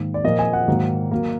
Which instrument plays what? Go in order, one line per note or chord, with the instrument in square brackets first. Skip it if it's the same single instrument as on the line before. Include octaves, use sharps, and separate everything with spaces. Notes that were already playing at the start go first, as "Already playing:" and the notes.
Already playing: [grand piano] G#2 D#3 A#3
D5
A#2 F3 A#3 D#5
G#5
F#5
G#2 D#3 F#3 A#3
F#3 A#3